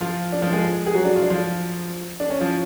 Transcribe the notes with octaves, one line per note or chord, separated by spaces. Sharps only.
F3 F4
D4
F3 F4
G#3 G#4
G#4
F#3 F#4
D4
F4
D4
F3 F4
D4
C#4
F3 F4